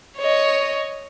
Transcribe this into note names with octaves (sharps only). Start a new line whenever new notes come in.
C#5 D#5